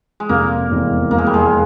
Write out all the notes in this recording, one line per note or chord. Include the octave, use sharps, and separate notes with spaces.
G#3
F1 A#3
E2 E3 G#3 C4
F1 A#3
G#3
G3
G#3